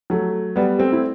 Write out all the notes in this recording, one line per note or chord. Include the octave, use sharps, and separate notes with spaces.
F#3 A3
G3 B3
A3 C4
E4